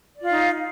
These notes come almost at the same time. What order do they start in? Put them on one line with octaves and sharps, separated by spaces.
D5 F4 F5 D#4